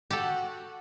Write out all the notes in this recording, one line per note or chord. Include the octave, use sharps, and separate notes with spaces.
F#4 G4 A4 F#5